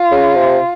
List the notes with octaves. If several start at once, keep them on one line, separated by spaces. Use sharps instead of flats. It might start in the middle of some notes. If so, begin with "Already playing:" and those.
Already playing: F4
C#3
C3